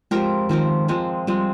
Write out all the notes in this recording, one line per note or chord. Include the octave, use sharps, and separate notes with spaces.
F3 G#3 C4 G4 A#4
D#3 F3 C4 G4 A#4
F3 G#3 C4
F3 G3 G#3 C4